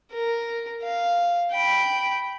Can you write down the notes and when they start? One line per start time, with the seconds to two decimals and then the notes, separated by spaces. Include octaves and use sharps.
0.12 A#4
0.83 F5
1.52 G5 B5